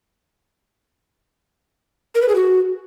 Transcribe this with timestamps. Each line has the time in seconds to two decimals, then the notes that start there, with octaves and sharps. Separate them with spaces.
2.15 A#4
2.22 B4
2.29 G#4
2.35 F#4